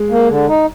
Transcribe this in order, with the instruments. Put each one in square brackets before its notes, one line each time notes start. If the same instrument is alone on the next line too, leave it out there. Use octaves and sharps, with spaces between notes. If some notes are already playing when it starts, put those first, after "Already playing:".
Already playing: [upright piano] G#3
[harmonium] A#3
D3
D#4